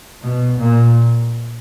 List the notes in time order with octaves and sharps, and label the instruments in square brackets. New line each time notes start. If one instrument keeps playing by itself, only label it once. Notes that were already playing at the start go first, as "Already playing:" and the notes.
[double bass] B2
A#2